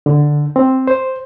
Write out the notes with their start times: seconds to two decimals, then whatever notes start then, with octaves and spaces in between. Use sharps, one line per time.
0.06 D3
0.56 C4
0.87 C5